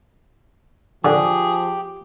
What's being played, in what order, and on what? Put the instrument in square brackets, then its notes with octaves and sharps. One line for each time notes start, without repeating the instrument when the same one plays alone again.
[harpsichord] D3 [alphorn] F3 [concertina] G4 [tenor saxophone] G#4